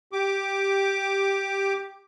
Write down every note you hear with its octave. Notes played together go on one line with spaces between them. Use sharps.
G4 D6